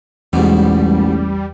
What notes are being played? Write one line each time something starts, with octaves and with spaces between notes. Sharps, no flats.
A1 E2 G#2 B2 E3 G3